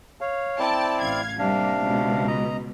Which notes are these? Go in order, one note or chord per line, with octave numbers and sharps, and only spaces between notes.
C#5 F5
C4 E4 D5 G5 A5
A1 F5 G#6
C3 G3 A#3 D4 F5
C#2 B2
D#5 A#5